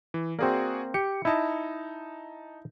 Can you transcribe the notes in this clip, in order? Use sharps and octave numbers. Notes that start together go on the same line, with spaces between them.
E3
A#3 C4 F#4 G#4 D5
G4 C#7
D#4 E4 D#5 A5